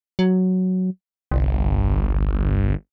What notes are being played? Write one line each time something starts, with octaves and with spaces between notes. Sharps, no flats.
F#3
G1 C2